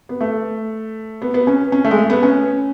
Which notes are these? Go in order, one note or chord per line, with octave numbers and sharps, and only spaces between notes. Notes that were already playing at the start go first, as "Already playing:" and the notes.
B3
A3
B3
B3
C#4
C#4
A3
G#3
A3
B3
C#4